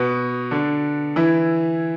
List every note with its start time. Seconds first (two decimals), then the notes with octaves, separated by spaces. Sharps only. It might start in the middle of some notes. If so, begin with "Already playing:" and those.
Already playing: B2 B3
0.51 D3 D4
1.16 E3 E4